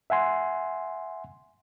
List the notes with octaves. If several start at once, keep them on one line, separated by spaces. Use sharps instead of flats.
E5 F#5 G#5 C6